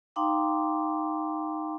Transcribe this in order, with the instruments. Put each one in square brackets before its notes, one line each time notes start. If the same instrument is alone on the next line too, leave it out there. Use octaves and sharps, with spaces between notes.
[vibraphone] D#4 F5 G5 A#5 C6 D6